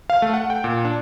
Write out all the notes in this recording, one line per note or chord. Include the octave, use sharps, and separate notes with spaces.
F5
A3
F#5
G5
A#2
D4